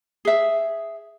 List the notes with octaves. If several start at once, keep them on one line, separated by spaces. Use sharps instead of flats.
G#4 E5